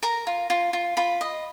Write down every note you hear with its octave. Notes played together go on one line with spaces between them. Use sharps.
A#4 A#5
F4
F4
F4
F4 B5
D#5